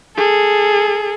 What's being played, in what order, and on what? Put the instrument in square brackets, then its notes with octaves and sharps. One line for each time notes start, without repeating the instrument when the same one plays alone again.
[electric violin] G#4 A4